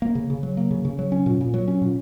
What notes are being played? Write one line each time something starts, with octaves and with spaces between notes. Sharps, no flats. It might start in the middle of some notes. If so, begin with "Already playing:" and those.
A#3
C#3
C#3
F#3
A#3
C#3
C#3
F#3
C#4
A#2
A#2
F#3
C#4
A#2